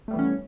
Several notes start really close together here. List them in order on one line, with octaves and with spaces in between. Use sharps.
A3 G3 B3 E3 C#4